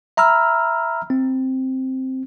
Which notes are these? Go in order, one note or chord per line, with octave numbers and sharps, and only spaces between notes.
E5 A#5 B5 E6 F6
C4